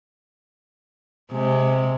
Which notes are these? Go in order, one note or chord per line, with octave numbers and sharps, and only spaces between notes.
C3 G#3